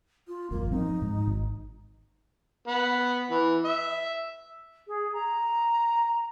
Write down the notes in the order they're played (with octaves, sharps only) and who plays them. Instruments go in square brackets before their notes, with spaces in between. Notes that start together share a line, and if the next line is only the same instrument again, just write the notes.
[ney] F4
[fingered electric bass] G#1 F2 [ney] A#3
[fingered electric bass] F3 C4 [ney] D#4
[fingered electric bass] G#2
G#1
[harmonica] B3
E3
E5
[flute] G#4
A#5